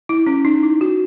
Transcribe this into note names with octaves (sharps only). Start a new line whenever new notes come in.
E4
C#4
D#4
E4
F#4